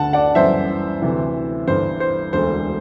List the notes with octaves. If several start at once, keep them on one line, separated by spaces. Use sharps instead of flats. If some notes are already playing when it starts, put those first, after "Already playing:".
Already playing: D2 D3 F#5 A5
D5 F#5
G1 F#2 E3 C5 E5
D2 C3 E3
G1 G2 E3 C5
C5
E1 D2 D3 C5